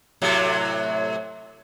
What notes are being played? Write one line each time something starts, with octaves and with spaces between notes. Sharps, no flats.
A2 C3 F#3